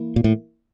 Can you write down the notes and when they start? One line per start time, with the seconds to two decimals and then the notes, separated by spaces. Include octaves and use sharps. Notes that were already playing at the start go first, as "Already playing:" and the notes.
Already playing: E3 A#3 E4
0.16 A#2
0.24 A2